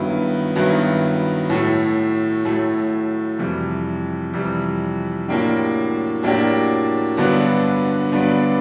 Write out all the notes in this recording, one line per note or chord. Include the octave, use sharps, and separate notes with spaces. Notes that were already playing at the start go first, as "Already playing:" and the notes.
Already playing: G2 D#3 F#3 B3 E4
G2 D#3 F#3 B3 E4
A2 F#3 A3
A2 F#3 A3
F2 C3 E3 G3
F2 C3 E3 G3
A2 F#3 A#3 D4 G4
A2 F#3 A#3 D4 G4
G2 D3 F#3 B3 D4
G2 D3 F#3 B3 D4